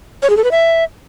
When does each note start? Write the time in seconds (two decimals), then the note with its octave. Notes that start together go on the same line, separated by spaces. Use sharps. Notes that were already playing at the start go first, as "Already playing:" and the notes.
0.23 C#5
0.30 G#4
0.37 A4
0.44 B4
0.51 E5